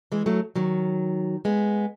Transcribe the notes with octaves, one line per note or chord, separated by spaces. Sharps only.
E3 G#3
F#3 A3
D#3 F#3
G#3 B3